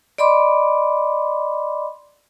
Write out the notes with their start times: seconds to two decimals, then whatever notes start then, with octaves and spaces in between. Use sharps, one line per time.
0.18 D5 D#5 B5 C6 D6